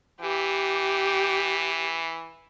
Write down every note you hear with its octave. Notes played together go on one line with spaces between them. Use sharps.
E3 G4